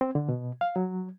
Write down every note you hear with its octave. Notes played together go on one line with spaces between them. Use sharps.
C4
D3
B2
F5
F#3